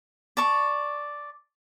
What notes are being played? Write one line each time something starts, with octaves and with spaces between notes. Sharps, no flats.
D5 A5 C#6